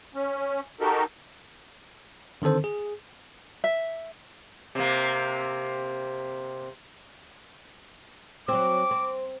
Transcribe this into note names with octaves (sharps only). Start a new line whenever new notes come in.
C#4
D#4 F#4 G4 A4 A#4
D3 D#3 C4 A4 C5
G#4
E5
C3 A#3
F#3 C4 D6
C4